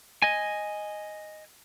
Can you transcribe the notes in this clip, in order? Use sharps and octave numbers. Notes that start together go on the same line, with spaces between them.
D#5 G#5